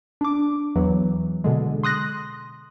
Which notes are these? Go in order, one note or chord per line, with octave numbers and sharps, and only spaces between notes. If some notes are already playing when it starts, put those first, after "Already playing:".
D4 D6
E2 E3 F#3
B2 D3 G#3
C6 D#6 F#6 A#6